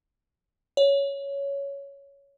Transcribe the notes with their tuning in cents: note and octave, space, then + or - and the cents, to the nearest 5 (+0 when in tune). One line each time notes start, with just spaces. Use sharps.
C#5 +10